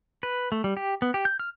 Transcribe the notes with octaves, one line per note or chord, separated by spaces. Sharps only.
B4
A3
G3
G4
B3
G4
G6
F6